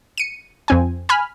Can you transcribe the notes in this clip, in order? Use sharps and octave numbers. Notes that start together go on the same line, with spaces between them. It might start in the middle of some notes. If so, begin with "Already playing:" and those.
C#7 D#7
F2 C4 G#5
G#5 B5 F6